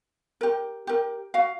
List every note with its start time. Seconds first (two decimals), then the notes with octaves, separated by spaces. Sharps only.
0.41 G4 A#4
0.87 G4 A#4
1.34 F#4 F5